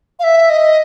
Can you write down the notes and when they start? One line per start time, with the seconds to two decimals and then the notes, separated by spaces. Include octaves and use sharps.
0.19 F5
0.24 E5
0.50 D#5